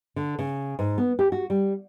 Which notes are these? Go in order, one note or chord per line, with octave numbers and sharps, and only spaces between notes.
D3
C#3
G#2
B3
G4
F#4
G3